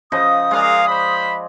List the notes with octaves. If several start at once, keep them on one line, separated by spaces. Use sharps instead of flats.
C#3 F3 D#5 D#6
G#3 G#4 A#4 D5 F5
C5 B5